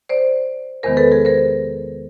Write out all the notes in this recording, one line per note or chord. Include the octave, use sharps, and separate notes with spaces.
C5 D5
E2 C3 D#3 G#3 B3 A#4 C5
A4 B4
G#4 A#4
A#4 C5